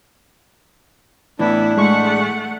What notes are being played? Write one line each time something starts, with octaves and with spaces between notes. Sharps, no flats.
A2 E3 B3 D4 E4
G#3 A3 F#5 C#6